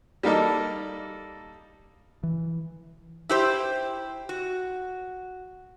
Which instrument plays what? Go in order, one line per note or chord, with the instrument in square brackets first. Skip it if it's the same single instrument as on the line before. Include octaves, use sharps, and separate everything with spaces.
[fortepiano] G3 A#3 D#4 A4
[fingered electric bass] E3
[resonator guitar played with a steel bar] E4 G4 C5
F#4